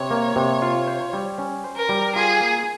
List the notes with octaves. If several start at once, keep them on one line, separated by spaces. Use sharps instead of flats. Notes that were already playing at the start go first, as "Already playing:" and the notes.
Already playing: C3 C#5
A#3
C3
F4
C5
G3
C#4
C5
A#4
G3
F4 G#4
A#3